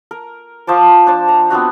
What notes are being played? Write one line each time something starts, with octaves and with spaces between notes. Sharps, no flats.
A#4
F3 C5 A5 D6
D4 C5 A5
A#5
B3 C4 D4 F#4